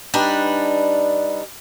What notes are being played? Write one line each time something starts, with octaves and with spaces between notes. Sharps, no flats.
G3 D4 D#4 B4